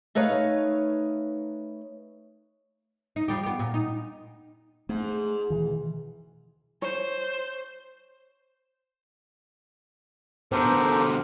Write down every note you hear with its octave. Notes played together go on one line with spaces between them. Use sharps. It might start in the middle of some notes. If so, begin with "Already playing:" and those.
A3 D#4 B4 C#5 F5
D#4
F3 G3 G4
B3 G4
A#2
D#4
G#2 A3
B2 D#3 E3
C5 C#5
B2 D3 G4 A4 A#4 C5